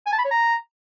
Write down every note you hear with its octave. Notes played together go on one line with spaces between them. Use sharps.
G#5
A5
B5
C#5
A#5